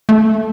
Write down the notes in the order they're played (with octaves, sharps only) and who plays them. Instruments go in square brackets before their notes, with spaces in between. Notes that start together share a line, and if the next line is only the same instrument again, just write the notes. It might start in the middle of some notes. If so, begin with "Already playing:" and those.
[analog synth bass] A3